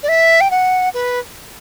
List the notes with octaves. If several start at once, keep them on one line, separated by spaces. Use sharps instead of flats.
D5
E5
G5
F#5
B4